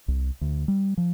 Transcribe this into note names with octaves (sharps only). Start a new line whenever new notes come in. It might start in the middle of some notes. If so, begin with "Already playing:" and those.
C2
D2
G3
F3